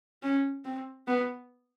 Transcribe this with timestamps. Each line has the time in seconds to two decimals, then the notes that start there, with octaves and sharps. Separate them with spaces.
0.23 C#4
0.65 C4
1.07 B3